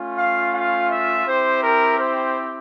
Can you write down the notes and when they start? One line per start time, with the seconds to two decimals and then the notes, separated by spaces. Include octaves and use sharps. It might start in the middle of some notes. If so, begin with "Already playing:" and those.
Already playing: A3 C#4 F4
0.17 F5
0.54 F5
0.90 E5
1.26 C4 E4 G4 C5
1.62 A#4
1.98 C5